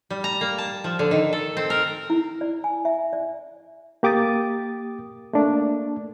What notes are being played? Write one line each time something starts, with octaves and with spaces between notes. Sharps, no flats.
G3
A#5
A#3
A5
F3
D3
D#3
A4
C4
A#4
E4
D5
G#5
E5
D5
A#3 G4 D6 D#6 A6
A3 A#3 D4